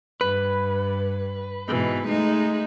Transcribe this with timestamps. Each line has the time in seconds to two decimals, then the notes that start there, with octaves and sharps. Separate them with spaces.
0.21 G2 B4
1.68 G#2 B2 E3
2.08 G#3 A3 D#4